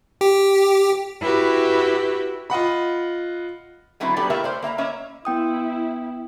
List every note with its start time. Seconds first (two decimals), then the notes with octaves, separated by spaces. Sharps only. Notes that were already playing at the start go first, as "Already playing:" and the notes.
0.21 G4
1.21 E4 F#4 G4 B4
2.50 F4 D#5 F#5 B5
4.00 D3 F#3 A3 B3 C4 E4
4.16 F#3 G3 B3 D4 A4
4.30 A3 A#3 E4 G4 A#4 E5
4.44 C5 D5
4.62 A#3 E5 F5 A#5
4.78 A#3 C#4 C#5 D#5 E5
5.25 B3 E4 G5 D#6